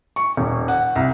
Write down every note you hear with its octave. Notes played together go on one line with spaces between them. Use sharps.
C#6
D#1
F#5
C2